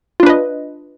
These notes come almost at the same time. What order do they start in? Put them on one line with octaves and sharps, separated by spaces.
F4 D4 B4 D#5